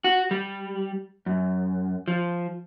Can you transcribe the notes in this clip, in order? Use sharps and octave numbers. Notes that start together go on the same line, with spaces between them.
F#4
G3
F#2
F3